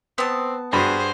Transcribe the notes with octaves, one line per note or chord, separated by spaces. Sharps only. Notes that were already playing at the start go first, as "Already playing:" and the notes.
B3 C4 A5
G2 F#4 G#4 C5 B5